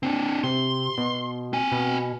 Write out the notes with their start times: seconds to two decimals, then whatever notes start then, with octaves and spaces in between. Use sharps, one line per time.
0.03 C4 D4
0.44 C3 C6
0.98 B2
1.53 C4 G#5
1.72 B2